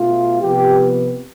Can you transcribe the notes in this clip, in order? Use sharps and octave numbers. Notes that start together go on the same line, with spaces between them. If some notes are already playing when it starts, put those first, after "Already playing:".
Already playing: B2 A3 F4
C3 F3 B3 G4